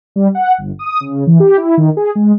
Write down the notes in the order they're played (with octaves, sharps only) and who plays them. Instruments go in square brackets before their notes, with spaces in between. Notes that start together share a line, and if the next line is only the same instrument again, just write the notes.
[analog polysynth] G3
F#5
G1
D#6
C#3
E3
G4
E4
D#3
G#4
G#3